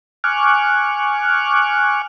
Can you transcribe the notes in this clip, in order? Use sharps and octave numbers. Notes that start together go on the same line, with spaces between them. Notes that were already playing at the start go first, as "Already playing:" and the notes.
G#5 C#6 D6 F6 F#6